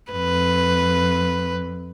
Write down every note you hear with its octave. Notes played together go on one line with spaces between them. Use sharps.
F2 B4